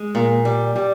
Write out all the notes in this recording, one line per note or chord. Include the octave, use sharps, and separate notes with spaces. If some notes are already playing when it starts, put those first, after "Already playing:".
Already playing: G#3
A#2
G3
G3